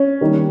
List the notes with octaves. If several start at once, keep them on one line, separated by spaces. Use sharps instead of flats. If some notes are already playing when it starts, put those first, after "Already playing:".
Already playing: C#4
D#3 G3 A#3 D#4